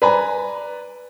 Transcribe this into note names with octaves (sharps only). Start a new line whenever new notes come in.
B4 D5 G#5 A#5 B5